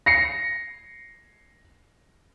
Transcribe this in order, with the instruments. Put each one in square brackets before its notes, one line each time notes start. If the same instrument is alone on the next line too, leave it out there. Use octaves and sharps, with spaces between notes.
[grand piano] A#6 C7 C#7